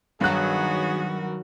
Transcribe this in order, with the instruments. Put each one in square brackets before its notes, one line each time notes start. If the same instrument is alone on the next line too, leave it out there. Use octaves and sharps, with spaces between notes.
[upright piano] G2 F#6 [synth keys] D#3 F#3 [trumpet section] B3 G#4 C#5 [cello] F#4